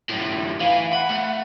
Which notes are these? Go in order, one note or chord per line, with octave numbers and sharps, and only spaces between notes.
F#2 A2
E3 E4 F5
F#5 B5
A3